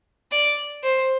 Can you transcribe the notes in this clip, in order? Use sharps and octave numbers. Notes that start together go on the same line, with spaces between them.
D5
C5